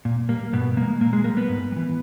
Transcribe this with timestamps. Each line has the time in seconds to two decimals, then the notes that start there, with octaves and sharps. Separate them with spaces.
0.05 A#2
0.29 G3 A#3
0.53 G2 B2 B3
0.77 E3 G#3 A#3
1.01 A#2 A#3
1.13 G#3 G#4
1.24 G3 A#3 A#4
1.37 B3 B4
1.49 G#2
1.72 G3
1.76 E3